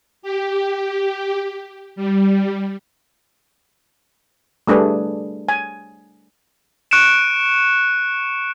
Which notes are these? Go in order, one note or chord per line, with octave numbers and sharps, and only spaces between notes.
G4
G3
G3 A3 D4 G#4 B4
G#5
C#6 F#6 C#7 D7 E7